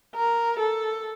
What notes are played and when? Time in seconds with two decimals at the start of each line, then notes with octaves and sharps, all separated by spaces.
0.16 A#4
0.60 A4